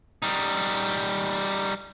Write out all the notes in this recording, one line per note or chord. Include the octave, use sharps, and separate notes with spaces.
G3 D#4